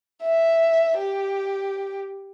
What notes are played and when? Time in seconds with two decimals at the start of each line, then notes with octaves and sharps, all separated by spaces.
0.23 E5
0.98 G4